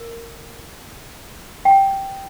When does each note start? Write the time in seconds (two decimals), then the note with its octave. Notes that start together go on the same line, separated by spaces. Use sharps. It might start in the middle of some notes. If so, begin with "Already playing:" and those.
Already playing: A#4
1.65 G5